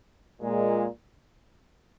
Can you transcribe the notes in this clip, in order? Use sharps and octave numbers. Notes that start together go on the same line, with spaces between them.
A#2 G#3